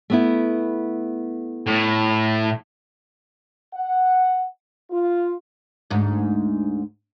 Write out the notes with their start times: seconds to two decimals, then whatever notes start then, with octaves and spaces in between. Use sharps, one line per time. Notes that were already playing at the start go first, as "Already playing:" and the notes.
0.10 A3 B3 E4
1.67 A2
3.74 F#5
4.91 F4
5.90 D2 G#2